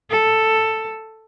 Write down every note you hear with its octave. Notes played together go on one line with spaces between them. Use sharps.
A4